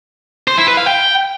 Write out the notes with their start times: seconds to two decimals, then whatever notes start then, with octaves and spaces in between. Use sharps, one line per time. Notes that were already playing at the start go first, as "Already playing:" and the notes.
0.48 C5
0.58 E4
0.68 B4
0.77 F5
0.87 G5